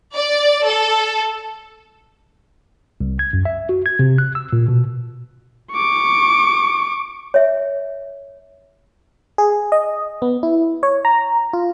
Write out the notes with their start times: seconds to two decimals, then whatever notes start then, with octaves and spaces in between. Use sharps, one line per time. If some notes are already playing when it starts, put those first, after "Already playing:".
0.14 D5
0.65 A4
3.01 C2
3.19 G#6
3.33 F#2
3.45 E5
3.69 F#4
3.86 G#6
3.99 C3
4.18 F#6
4.35 E6
4.53 A#2
4.68 B2
5.72 C#6 D6
7.34 C#5 E5
9.38 G#4
9.72 D#5
10.22 B3
10.43 E4
10.83 C#5
11.05 A#5
11.53 F4